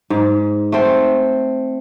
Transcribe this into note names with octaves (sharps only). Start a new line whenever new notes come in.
G#2
A3 C4